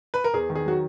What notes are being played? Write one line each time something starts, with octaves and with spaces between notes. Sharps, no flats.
B4
A#4
E2 G#4
D#3
G#4
F#3 F#4